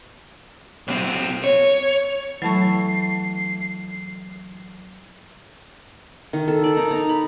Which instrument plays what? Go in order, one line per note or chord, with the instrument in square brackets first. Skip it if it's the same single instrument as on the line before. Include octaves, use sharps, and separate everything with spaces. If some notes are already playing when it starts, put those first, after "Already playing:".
[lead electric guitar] B1 C4
C#5
[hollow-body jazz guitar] E3 A3 [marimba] F#3 A5 C#6 [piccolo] C7
[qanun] D#3
A4
D5
D#4
A#5
B5